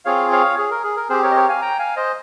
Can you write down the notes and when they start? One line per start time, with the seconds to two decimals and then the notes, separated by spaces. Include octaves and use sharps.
0.05 C4 F4 G#4 C#5 F5
0.32 C#5 F5
0.58 G#4
0.71 A#4
0.84 G#4
0.96 A#4
1.10 C4 G4 G#4 C5
1.23 A#4 C#5
1.31 D#5
1.36 A#4 C#5
1.49 F5 G#5
1.62 G5 A#5
1.79 F5 G#5
1.96 C5 D#5